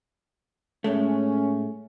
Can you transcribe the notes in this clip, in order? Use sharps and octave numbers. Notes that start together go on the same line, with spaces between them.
A2 G#3 A3 C#4